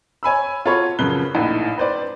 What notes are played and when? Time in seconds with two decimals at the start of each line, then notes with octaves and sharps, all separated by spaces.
0.23 C#5 G#5 B5 E6
0.66 F4 F#4 A4 C#5 B5 C#6
0.99 F#2 C#3 F3 B4 F#6 G7
1.35 A#1 A2 D#4
1.78 B4 C5 D5